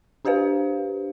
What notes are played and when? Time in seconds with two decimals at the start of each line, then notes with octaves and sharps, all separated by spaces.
0.25 D4 G4 B4 C5 F5